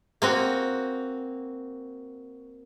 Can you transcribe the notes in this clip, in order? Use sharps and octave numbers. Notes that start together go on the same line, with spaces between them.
A#3 C4 F#4